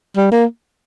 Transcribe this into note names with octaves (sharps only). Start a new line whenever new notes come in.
G3
A#3